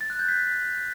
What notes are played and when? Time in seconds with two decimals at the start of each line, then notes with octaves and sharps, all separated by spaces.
0.01 A6
0.10 F#6
0.19 G6
0.28 B6